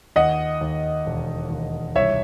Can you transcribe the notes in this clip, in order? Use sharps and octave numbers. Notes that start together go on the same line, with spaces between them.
D#2 D#5 F#5
D#2
E1
D#2
C2 C#5 E5